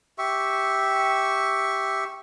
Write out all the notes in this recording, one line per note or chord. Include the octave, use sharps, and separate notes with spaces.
G4 E5 C#6